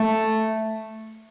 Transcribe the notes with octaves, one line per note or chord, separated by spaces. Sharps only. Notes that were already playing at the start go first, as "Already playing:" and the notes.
Already playing: A3